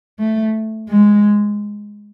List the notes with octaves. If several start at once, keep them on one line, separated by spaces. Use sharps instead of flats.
A3
G#3